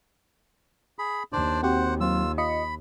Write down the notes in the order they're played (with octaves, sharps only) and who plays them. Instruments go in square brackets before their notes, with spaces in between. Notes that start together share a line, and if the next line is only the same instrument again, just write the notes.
[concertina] G#4 B5
[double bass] D#2 [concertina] D4 C5 D5
[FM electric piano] C4 F#4 G4 [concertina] C5 F#5
[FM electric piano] F#3 C4 [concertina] F4 E6
[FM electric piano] F4 D#5 C#7 [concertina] B5